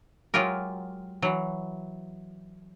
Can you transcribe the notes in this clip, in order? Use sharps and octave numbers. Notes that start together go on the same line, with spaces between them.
F#3 G#3 F4 G4 A#4
E3 F#3